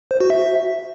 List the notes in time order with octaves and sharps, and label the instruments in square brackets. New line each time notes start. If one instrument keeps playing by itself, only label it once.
[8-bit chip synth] C5
F#4
E5